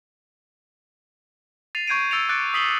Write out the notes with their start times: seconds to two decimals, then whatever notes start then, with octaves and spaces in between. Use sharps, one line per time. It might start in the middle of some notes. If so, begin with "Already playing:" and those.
1.75 A6 C7 D#7 F7
1.87 C#6 G6 G#6 C7 D7 D#7
2.11 E6 A6 C#7 D7 F7
2.29 D6 F#6 A6 C#7 D7
2.54 D#6 B6 C7 F#7 G7